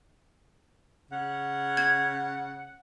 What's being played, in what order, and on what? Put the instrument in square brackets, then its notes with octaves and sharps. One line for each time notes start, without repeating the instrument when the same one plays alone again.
[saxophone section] C#3 F#5
[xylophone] G#6